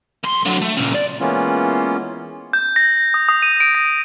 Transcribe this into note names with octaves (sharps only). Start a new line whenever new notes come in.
B1 C6
D3 F#3
A3
A#2 C#3
D5
E3 G#3 A#3 B3 C#4 F4
G6
A#6
D#6
D#6
D#7
D7
A#6